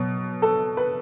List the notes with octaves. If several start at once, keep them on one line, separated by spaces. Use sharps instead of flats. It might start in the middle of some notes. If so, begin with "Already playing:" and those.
Already playing: B2 F#3 B3
A4
B4